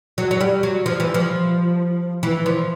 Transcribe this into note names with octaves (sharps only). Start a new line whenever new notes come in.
F#3
F#3
G3
F#3
F3
E3
F3
E3
F3